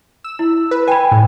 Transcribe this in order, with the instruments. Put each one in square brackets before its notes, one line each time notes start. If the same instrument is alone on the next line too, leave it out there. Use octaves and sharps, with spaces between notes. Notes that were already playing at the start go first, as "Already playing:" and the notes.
[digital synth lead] E6
[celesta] E4
[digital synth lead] B4
[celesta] G5 B5 [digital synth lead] G#5
[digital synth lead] A2